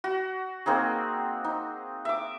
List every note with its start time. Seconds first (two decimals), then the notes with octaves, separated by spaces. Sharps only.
0.04 F#4
0.66 A#3 C4 D#4 G#4
1.44 D#4
2.05 E5 D6